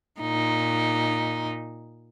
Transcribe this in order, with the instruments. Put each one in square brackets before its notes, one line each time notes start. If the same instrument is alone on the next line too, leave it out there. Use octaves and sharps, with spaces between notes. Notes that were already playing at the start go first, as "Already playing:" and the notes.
[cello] A#2 D#4